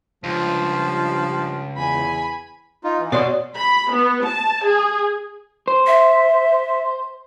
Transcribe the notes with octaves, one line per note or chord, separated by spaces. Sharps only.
C#2 G2 F3
E2 G#5 B5
D#4 F4
E3
B2 C#5 D5 C6
B5
B3
A5
G#4
C5
E5